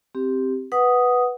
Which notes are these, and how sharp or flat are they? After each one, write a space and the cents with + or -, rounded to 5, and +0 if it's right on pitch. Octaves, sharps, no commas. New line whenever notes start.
C4 +0 G4 +0
B4 +0 F#5 +0 D#6 +0